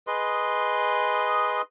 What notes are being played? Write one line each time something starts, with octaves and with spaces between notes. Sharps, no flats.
G#4 B4 D#5 C6